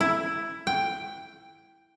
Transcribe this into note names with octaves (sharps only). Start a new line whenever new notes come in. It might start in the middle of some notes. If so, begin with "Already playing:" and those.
E4
G5